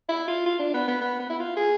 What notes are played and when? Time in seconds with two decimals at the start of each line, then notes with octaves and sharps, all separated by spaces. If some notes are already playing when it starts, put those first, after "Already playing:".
0.09 E4
0.28 F4
0.46 F4
0.59 D4
0.74 B3
0.88 B3
1.01 B3
1.19 B3
1.30 E4
1.39 F4
1.57 G#4